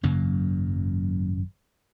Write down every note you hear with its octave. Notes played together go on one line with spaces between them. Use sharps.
G#1 F#2 C#3 F#3 A#3